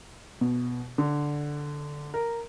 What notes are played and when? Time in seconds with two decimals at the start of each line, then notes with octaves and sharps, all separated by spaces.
0.41 B2
0.98 D3
2.14 A#4